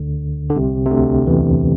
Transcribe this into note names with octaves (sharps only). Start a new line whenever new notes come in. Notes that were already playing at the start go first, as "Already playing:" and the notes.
Already playing: D2 D3
D3
C2 C3
C3
D2 D3
E2 E3